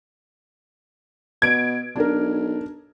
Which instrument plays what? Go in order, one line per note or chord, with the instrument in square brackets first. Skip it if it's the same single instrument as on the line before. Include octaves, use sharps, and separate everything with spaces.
[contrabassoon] B2 [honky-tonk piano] G#6 D7
[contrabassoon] B1 [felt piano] D4 A#4